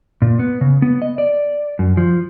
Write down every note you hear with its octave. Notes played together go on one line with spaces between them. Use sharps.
A#2
B3
C#3
B3
D#5
D5
F#2
F3